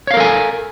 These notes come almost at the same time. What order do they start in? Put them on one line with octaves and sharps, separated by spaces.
C#5 F5 A#4 A4 G#5